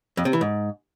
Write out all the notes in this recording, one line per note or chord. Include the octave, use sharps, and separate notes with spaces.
F2
C3
E3
G#2